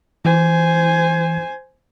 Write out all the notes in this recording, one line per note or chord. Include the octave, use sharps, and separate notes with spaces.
E3 C5 G#5